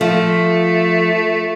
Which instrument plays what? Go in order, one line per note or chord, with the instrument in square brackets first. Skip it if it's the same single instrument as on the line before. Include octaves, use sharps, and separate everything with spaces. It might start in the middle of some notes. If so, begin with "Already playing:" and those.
[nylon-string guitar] F3 [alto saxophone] A3